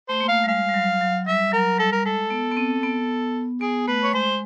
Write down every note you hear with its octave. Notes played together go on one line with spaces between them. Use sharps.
A3 C5
A#3
A3 F5
G3
G#3 F5
G3
F#3
F#3
G3 E5
F#3 A#4
G3 A4
A#4
G#3 A4
B3
B3
C4
B3
B3 G#4
A3 B4
C#5
G#3 C5